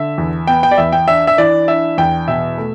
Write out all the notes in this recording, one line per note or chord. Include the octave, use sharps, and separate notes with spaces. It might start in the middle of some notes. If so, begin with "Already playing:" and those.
Already playing: D3 E5
E2
B3 G5
G5
D5
E2 E5
G5
D4 E5
E5
E3 D5
D4 E5
E2 G5
B2 E5
A3